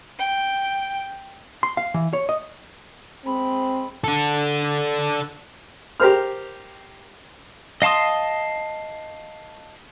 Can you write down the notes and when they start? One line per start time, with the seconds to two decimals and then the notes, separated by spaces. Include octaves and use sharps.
0.19 G5
1.63 C6
1.77 F5
1.94 E3
2.13 C#5
2.29 D#5
3.26 G#3 C4 B5
4.04 D4 A4
6.00 G4 A#4 C5 F6
7.82 D#5 F5 A5 C6 D#6